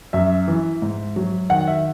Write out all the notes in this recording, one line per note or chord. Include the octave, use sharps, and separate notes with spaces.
F#2 E5
E3
G#2
F#3
D#3 F#5
E5